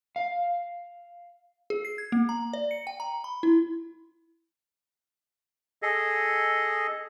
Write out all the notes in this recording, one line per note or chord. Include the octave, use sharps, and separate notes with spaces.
F5
G#4
C7
G#6
A#3
A#5
D5
C#7
G5
A#5
B5
E4
G#4 A4 D#5